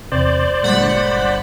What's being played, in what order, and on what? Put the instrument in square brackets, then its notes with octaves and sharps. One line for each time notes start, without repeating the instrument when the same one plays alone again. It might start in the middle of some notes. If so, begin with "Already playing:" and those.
[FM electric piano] E2 C3 [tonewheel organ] C5 D5
[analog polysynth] G1 F#5 B5 [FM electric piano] A#2 G#3